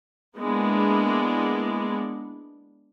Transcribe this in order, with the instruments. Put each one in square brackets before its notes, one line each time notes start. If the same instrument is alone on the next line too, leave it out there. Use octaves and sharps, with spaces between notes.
[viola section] G#3 A#3 B3 D4 E4